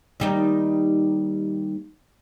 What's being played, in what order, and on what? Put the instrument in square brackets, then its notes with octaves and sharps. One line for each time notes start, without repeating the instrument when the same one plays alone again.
[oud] D#2 G3 D#4